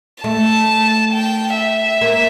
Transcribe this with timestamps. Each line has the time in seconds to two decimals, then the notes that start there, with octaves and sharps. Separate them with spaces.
0.24 A3 A5
1.13 G5
1.57 E5
2.01 A#3